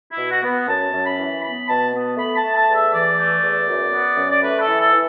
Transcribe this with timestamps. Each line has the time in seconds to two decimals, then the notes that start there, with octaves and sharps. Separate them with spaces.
0.12 E4
0.18 B2
0.31 F#4
0.43 B3
0.68 F#2 A5
0.93 F#2
1.05 B5
1.18 E3
1.43 B3 B5
1.67 B2 A5
1.93 B3
2.17 A3 B5
2.36 A5
2.42 A3
2.55 A5
2.68 E2
2.74 E5
2.92 E3 D5
3.18 A3
3.42 E2
3.68 F#2
3.92 B3
4.17 F#2
4.30 D5
4.42 A3 B4
4.61 A4
4.67 E3
4.79 A4
4.92 E3